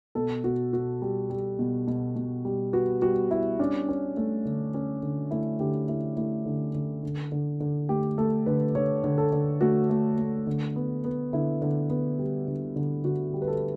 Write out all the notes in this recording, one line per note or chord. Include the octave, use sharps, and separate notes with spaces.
B2 A4
B2 F#4
B2 F#4
G3
G3
B2
B2
B2
G3
B3 F#4
G3 F#4
G3 E4
C#4 D4
C#4
A3
D3
C#4
D3
A3 E4
D3 G4
A3 E4
A3 E4
D3
D3
D3
D3
D3
A3 G4
A3 A4
D3 B4
D3 C#5
D3
A4
D3
A3 F#4
A3
A3
D3
B3
B3
D3 E4
D3
B3
G3
D3
D3
D3 F#4
G3
B4
A4